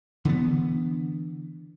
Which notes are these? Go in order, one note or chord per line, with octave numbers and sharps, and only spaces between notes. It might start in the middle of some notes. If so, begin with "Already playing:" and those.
D3 E3 A3 B3